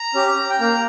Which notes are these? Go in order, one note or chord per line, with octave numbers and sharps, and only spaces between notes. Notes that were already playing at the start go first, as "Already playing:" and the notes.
Already playing: A#5
C#4 G4
G5
A#3 A#5